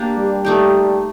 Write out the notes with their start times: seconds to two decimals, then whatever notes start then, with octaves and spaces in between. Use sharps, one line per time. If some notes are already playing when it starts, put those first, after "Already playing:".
Already playing: A#3 D4 G4
0.16 G3
0.45 A3 D#4 G4